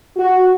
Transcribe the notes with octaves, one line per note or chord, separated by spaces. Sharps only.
F#4